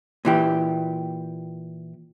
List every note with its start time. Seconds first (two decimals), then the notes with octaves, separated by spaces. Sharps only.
0.25 A#2 E3 G4